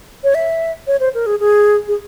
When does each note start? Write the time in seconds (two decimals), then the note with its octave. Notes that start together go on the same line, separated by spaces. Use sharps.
0.24 C#5
0.35 E5
0.87 C#5
1.00 C5
1.14 A#4
1.26 G#4
1.40 G#4
1.88 G#4